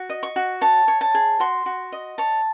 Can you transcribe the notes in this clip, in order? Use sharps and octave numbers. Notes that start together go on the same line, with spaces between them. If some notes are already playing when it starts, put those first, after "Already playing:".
Already playing: F#4
D#5
C#6
F#4
C#5 A5
C#5
A5
G#4
F#4 C6
F#4
D#5
C#5 A5